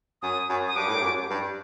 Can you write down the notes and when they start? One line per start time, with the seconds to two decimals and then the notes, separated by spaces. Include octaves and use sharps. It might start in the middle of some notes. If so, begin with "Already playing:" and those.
0.22 F#2 D#6
0.50 F#2
0.68 D#6
0.76 G2 D6
0.88 A2
0.95 G2
1.03 F#2
1.30 G2